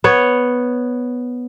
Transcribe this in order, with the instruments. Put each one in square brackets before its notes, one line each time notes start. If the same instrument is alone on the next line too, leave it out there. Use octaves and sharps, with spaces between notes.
[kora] B3 C#5